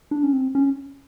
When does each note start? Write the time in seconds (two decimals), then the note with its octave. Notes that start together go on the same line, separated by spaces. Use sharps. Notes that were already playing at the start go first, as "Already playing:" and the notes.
0.11 D4
0.23 C#4
0.33 C4
0.55 C#4